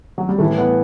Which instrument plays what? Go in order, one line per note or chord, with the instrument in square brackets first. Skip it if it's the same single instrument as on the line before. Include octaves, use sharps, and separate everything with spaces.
[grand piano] F#3
G3
A2 E3 A3
B3